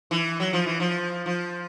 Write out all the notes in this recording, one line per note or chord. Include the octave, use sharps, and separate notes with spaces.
E3
F#3
F3
E3
F3
F3